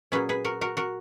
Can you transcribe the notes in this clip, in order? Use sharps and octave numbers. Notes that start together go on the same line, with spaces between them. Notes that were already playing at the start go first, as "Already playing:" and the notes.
A#2 F#3 C#4 G#4 B4
G#4 B4
F#4 A#4
F#4 A#4
F#4 A#4